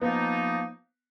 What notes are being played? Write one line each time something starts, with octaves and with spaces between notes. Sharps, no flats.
F3 A#3 B3 D#4